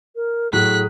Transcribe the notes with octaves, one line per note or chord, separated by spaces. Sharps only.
A#4
A2 F#3 G#4 F#6 B6